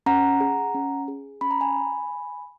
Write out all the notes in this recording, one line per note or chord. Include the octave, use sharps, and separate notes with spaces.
C#4 F#5 A#5
G#4
C#4
G#4
C#4 B5
A#5
G#5 B5